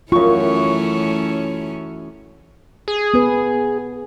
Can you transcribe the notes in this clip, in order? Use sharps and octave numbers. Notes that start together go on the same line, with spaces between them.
F#2 E3 A3 C#4 F4 C#6
G#4
B3 B4